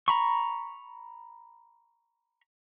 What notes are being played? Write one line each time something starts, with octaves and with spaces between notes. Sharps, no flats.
A#5 B5 C#6